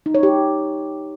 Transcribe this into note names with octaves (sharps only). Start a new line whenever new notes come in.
D#4
C#5
G4